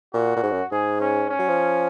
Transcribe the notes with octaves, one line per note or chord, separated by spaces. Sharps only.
A#2 F#4
A#2
G#2
F#2
G#2 G#4
C#4
C#4
F#3
F3